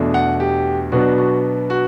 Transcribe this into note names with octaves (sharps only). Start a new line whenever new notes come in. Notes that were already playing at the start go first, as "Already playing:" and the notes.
Already playing: E2 B2 A3 D4
F#5
G4
B2 F#3 B3 D4 F#4
F#4
F#4